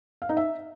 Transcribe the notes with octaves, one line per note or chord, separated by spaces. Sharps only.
F5
D#4
E5